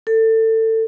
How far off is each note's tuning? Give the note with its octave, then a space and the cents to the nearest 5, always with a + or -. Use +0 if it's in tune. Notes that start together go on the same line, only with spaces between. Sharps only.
A4 +25